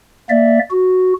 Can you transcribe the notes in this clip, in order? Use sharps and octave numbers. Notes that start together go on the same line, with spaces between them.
A#3 D5 E5
F#4